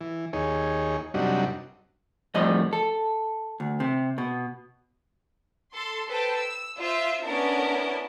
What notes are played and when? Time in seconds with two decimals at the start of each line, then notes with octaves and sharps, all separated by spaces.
0.01 E3
0.33 D#2 D#4 G#4 C#5
1.14 F#2 C3 G3 D4 D#4 F#4
2.34 F2 A2 G3 D#5
2.73 A4
3.60 D2
3.80 C3
4.18 B2
5.74 A4 C6
6.08 A4 B4 C5 G5 A5
6.37 E6
6.78 F4 C5 E5
7.23 B3 C#4 D4 E4 A#4 A5